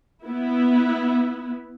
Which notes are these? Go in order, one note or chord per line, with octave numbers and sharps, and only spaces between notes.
B3 E4